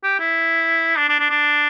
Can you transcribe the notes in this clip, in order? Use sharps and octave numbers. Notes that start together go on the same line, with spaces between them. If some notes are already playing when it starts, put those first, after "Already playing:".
G4
E4
D4
D4
D4
D4